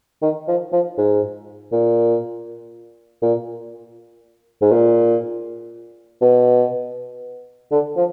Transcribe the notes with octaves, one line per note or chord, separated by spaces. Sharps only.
D#3
F3
F3
G#2
A#2
A#2
G#2
A#2
B2
D3
F3